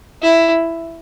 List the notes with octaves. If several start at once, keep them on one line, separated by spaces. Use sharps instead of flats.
E4